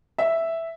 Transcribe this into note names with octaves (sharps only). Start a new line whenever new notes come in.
E5